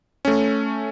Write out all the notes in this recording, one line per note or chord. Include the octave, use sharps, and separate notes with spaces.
A3 C#4